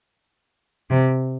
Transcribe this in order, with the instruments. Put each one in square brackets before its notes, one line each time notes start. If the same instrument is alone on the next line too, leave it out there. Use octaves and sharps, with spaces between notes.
[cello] C3